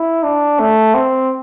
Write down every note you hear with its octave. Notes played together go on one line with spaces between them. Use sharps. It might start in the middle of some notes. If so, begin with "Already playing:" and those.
Already playing: E4
D4
A3
C4